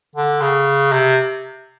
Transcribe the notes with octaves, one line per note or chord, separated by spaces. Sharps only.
D3
C#3
C3